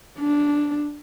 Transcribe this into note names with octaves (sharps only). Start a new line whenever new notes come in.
D4